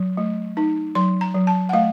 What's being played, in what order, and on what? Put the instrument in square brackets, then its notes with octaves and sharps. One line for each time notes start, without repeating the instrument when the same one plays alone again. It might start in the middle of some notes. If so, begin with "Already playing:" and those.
Already playing: [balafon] F#3
A3
D#4
F#3 C6
A#5
F#3
A5
F#5
A3 F5